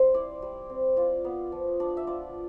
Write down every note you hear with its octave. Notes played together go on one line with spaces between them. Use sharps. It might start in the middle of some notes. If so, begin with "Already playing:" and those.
Already playing: G3 C4 C5
E4 D5
G3
C4
F4 D5
B3
F3
D4 D5
E5
F4 D5